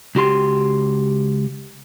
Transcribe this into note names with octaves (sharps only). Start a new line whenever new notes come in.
C#2 F#4 G4 C6